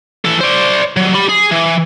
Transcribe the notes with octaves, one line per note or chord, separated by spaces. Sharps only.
E3 A4
C5 D5
F#3 G3
G4 B5
G#4
E3